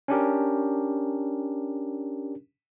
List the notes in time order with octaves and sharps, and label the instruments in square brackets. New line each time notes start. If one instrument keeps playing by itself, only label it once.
[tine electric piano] C#4 D4 G4 A#4